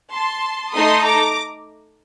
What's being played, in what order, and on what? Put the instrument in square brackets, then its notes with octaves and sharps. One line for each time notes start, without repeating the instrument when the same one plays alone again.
[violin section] A5 C6
A3 D#4 A4 C6 D#6
A#5 D6